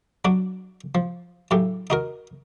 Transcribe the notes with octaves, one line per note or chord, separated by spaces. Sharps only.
F#3 D4 F#4
F3
A2 C#3 F#3 G4
D#4 F#4 A#4